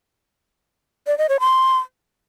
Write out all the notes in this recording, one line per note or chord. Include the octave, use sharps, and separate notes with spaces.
D5
D#5
C#5
C6